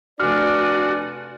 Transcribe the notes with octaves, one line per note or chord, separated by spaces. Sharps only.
F1 D4 F#4 D5 G#5 F6